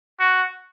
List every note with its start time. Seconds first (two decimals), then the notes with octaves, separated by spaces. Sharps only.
0.20 F#4